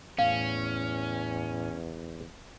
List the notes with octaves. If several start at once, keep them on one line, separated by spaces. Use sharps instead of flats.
E2 A2 C#4 F5